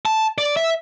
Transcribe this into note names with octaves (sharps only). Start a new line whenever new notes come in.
A5
D5
E5